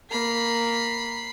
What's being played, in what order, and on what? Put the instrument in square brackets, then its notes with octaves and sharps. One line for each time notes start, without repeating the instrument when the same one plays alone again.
[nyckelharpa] A#3 A#5 [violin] B5 C7